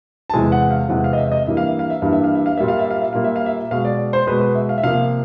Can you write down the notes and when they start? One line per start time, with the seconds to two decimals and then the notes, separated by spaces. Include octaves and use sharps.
0.30 A5
0.33 E2 C3 E3 G#3 G#5
0.52 F#5
0.71 F5
0.89 E2 C3 E3 G#3 F#5
1.04 F5
1.13 D#5
1.18 E5
1.32 D#5
1.46 G2 E3 G3 A#3 E5
1.57 F5
1.68 E5
1.79 F5
1.90 E5
2.02 G2 E3 G3 A#3 F5
2.13 E5
2.24 F5
2.35 E5
2.46 F5
2.58 A#2 G3 A#3 E5
2.68 F5
2.79 E5
2.91 F5
3.02 E5
3.13 A#2 G3 A#3 F5
3.24 E5
3.36 F5
3.46 E5
3.71 B2 G#3 F5
3.85 D5
3.99 D5
4.13 C5
4.27 B2 G#3 B4
4.41 B4
4.55 E5
4.69 F5
4.78 E5
4.83 C3 F3 A#3 F5